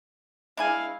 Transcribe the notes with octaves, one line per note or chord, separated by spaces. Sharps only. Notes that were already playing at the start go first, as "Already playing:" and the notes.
G#3 D4 E4 F5 G#5